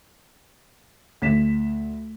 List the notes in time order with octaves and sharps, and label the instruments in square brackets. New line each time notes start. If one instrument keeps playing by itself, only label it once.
[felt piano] D2 B6 E7 [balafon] A3